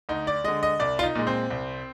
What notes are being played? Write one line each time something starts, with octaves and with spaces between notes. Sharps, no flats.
D2 D#4
D5
D3 G#3 D#5
D#5
C2 D5
F4
D#4
A#2 G#3
C4
C2